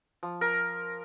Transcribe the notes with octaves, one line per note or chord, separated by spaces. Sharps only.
F3
A#4